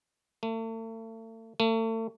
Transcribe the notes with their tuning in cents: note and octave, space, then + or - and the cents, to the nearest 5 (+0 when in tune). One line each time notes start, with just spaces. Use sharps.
A3 +40
A3 +40